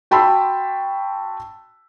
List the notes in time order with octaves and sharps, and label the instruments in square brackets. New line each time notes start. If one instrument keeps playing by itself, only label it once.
[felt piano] F#4 G5 A5 B5 C6 E6